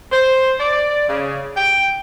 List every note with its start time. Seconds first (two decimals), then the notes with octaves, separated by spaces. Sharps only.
0.12 C5
0.60 D5
1.08 C#3
1.56 G5